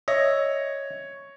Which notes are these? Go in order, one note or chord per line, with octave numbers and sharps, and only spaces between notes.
C#5 D#5 E5 A#6